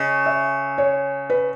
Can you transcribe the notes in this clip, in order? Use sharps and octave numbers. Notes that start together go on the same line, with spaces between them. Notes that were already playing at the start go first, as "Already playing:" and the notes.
Already playing: C#3 D#5
E5
C#5
B4